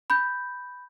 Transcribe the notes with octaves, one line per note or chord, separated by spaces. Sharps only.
B5 G6